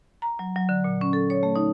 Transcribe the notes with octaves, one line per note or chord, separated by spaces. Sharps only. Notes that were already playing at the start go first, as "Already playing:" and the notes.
A#5
F#3
F#3
D3
A#2
C#4
A4
C#5
A3
D#4